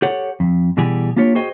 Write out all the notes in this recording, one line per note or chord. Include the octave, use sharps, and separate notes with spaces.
G4 A4 C#5 F#5
F2
B2 E3 G3 G4 G#4
A#3 D4 F4 G4 C#5
F#4 G#4 C5 D#5 G5